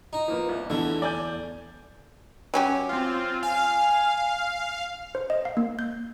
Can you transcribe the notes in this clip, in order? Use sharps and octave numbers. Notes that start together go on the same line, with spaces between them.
D#4
F3 A#3 B3
C2
E2 D3 A3
D5 G#5 G6
F#3 C#4 G4
C4 F4
F5 G#5
C5
D#5
F5
A#3
G6